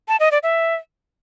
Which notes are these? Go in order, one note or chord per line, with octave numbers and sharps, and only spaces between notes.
A5
D#5
D5
E5